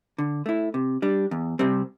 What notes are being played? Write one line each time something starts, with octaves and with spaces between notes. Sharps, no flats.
D3
A3 E4
C3
G3 D4
E2
C3 G3 C4